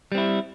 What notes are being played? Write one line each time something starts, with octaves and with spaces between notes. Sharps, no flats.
G3 C4 E4